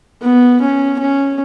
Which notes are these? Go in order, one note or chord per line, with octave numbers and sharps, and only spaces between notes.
B3
C#4
C#4